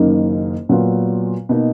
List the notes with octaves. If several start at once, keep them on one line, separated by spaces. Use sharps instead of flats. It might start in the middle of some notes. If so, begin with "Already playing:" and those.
Already playing: F#1 F#2 D#3 A#3 D#4
A#2 F#3 B3 F4
B2 A#3 D#4